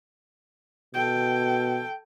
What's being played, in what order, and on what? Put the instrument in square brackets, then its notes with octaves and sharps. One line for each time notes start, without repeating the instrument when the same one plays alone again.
[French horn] B2 [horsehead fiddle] A4 G5